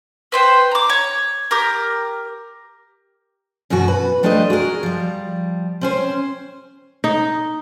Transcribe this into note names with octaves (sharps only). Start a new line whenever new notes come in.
B4 C5 G5
A#5 D6
C#5
G4 A#4
F#2 B2 E3 F#4
B4
G3 A3 D4 F4 G4 D#5
F#4 G#4 A#4
F3 G3
C4 C#4 C5
D#4